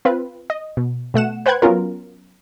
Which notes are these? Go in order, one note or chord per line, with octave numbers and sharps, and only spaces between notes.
C4 F4 B4
D#5
B2
B2 A3 F#5 E7
B4 C5 F#5 G5 F#6 G#6
F#3 B3 C#4 F4 A#4